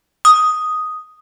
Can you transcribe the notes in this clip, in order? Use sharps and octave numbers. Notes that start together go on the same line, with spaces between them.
D#6